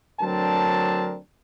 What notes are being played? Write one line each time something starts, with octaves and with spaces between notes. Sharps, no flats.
D2 F#3 C4 D4 A#4 A5